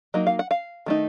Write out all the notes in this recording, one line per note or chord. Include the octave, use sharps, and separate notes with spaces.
F#3 A#3 D#4 D#5
F5
F#5
F5
D#3 A3 D#4